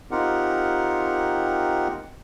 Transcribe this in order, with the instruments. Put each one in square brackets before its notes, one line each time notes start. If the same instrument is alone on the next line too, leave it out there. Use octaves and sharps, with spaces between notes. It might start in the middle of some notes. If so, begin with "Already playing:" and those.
[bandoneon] C4 D#4 F4 G4 A#4 F#5